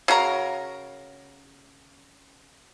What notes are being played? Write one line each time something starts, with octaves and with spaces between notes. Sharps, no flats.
C#3 F#4 A#4 A#5